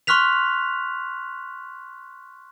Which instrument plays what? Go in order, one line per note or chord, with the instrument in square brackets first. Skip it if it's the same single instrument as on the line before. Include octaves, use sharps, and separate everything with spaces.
[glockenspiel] C6 C#6 F6 F#6 B6 F7